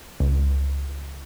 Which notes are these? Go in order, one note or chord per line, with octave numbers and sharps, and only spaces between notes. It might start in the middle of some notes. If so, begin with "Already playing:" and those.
C#2